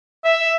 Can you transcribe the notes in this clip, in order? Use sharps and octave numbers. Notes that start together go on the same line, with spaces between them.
E5